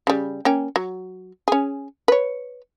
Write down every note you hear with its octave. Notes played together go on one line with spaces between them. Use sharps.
C#3 G3
A#3 C#4 G5
F#3
C#4 G#4
B4 C#5